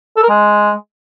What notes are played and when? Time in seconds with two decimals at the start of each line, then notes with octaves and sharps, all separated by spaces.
0.17 A4
0.23 A#4
0.29 G#3